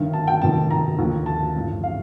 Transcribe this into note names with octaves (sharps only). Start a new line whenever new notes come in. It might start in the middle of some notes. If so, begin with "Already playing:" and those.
Already playing: G1 G2 D#3
A5
G5
F1 F2 D#3 A5
A#5
D#2 D3 F3
A5
A1 G2 D3 F3
F5